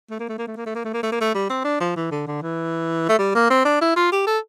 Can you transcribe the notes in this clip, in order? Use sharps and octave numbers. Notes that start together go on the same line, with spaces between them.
A3
A#3
A3
A#3
A3
A#3
A3
A#3
A3
A#3
A3
A#3
A3
G3
C4
D4
F3
E3
D3
D3
E3
A3
G3
A#3
C4
D4
E4
F4
G4
A4